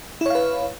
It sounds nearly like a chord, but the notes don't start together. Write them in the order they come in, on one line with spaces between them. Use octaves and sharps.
E4 C#5 F5 B4